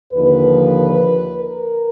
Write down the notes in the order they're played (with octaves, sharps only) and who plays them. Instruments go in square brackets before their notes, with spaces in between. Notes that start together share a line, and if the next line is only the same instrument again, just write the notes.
[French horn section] D#2 D3 F3 A#3 B4
A#4